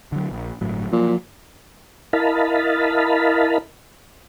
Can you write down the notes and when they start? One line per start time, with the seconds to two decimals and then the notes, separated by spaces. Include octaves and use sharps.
0.12 D3 F#3
0.31 A#1
0.61 G1 A2 F#3
0.92 A#2 F3 F#3
2.13 E4 A#4 D#5 F5 A5 B5